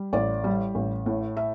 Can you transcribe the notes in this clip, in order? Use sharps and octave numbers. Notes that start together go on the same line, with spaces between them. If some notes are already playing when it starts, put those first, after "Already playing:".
Already playing: G3
A1 D5
G3
A1
A2
E5